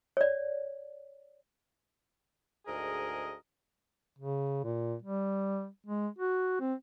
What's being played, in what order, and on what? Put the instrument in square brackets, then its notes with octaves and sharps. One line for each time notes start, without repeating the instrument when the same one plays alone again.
[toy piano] C#5 D5
[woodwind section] D2 G#2 G#4 A#4 D#5
[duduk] C#3
A#2
G3
G#3
F#4
C4